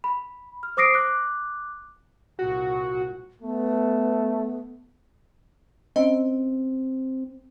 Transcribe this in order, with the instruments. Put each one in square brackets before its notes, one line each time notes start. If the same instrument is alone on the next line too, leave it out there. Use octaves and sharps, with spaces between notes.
[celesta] B5
F6
C5 D6 D#6 A#6 C7 D7
D6 F#6
[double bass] C2 A#2 [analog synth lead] F#4
[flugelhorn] A3 [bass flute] B3
[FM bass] C4 [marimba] C#4 D#5